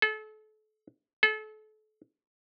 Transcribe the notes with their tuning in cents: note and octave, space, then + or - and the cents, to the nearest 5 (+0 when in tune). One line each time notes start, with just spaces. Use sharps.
A4 -35
A4 -35